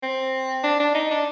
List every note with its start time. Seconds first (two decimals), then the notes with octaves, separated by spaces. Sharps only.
0.03 C4
0.64 D4
0.80 D4
0.95 D#4
1.11 D4